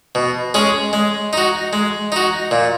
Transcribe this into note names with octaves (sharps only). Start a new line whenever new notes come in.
B2
G#3 C#4 G#4
G#3
D#4 F#4
G#3
D#4 F#4
A#2